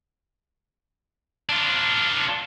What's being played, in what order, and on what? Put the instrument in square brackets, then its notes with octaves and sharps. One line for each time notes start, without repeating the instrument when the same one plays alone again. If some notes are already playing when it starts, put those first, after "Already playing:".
[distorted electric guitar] D4 F4